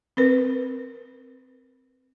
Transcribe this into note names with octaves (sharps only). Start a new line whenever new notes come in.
C4 A#4 B4